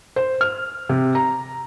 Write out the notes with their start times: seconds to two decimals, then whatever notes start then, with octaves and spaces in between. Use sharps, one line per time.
0.16 C5
0.41 F6
0.89 C3
1.15 A#5